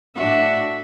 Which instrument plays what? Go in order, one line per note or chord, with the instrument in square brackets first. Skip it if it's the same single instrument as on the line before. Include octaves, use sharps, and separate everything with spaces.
[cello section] A2 D4 F#4 [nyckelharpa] E5